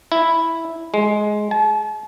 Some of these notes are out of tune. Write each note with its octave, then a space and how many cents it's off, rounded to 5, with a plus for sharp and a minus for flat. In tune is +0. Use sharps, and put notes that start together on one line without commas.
E4 +0
G#3 +15
A5 -40